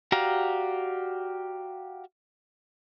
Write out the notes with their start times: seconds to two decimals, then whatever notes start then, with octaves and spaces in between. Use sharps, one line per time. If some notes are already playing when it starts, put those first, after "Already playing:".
0.12 F#4 G4 D5 F5 A#5